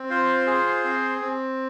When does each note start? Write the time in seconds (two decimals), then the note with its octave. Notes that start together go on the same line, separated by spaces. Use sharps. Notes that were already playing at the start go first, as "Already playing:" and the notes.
Already playing: C4
0.10 F4 C5
0.47 G#4
0.84 C4
1.21 C4